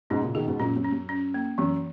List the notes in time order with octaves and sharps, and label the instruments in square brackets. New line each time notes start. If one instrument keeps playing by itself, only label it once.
[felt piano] G#2 B2 [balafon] C#4
[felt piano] A#2 C#3
[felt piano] B2 D#3 [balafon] G#4
[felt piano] G#2 B2
[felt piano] F#2 A#2 [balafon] C#4
[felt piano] F#2
[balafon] C#4
[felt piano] F#2
[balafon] C#4
A#3
[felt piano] F#2 [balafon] E3